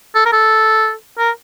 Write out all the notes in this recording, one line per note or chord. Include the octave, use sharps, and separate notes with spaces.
A4
A#4
A4
A#4